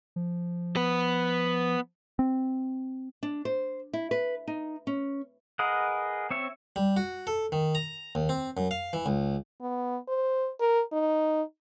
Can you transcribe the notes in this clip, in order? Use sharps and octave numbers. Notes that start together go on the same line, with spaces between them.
F3
B3 B4
C4
D4
C5
E4
B4
D#4
C#4
G#4 A#4 B4 D#5 F#5
C4 C#5 E5
G3
F#4
A4
D#3
A#5
D#2
C4
F#2
F5
E3
C#2
B3
C5
A#4
D#4